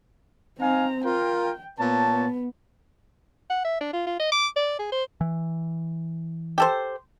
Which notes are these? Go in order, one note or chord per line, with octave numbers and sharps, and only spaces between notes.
C4 D#4 F5 G#5 A#5
F4 A#4 G5
A#2 B3 C#5 A5
B3
F#5
E5
D4
F4
F4
D#5
D6
D5
G#4
C5
E3
G4 A4 C5